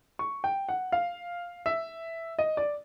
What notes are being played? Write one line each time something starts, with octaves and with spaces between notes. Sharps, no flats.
C#6
G5
F#5
F5
E5
D#5
D5